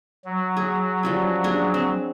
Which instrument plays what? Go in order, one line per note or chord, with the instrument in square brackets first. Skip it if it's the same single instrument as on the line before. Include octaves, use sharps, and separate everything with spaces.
[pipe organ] F#3
[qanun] G#4
F3 G3 C#4
D4 G#4
C4